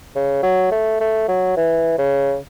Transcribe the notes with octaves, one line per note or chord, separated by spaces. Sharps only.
C#3
F#3
A3
A3
F#3
E3
C#3